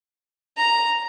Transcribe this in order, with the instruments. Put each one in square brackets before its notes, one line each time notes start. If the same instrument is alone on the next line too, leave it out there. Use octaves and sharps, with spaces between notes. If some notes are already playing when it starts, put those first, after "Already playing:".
[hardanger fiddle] A#5